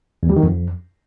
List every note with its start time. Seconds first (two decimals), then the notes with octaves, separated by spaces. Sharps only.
0.23 E2
0.30 G3
0.36 D#3
0.43 F2